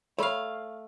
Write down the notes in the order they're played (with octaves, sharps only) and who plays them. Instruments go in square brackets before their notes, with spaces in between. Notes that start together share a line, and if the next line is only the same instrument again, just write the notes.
[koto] A3 F5 [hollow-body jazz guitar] C#5 B5